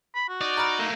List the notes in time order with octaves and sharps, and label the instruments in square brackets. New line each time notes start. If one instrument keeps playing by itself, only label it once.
[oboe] B5
F#4
[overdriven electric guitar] D#4 [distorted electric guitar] D5
[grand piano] A#5 B5 F6
[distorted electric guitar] A3 A#3